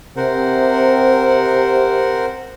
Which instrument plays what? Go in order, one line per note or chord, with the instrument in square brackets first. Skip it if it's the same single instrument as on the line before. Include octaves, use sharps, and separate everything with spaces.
[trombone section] C3 [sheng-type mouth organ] A#4 C5 F#5